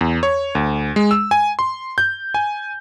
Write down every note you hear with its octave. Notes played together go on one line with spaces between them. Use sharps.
E2
C#5
D2
G#3
E6
G#5
C6
G6
G#5